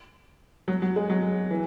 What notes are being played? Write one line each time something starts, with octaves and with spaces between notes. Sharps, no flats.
F#3
F#3
G#3
F#3
E3